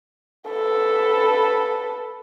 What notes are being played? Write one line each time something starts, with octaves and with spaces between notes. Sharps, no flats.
A4 B4